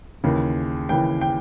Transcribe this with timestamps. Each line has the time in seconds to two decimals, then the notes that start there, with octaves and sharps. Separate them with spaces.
0.24 D#2 C#3 E3
0.89 D#2 C#3 E3 G5
1.21 G5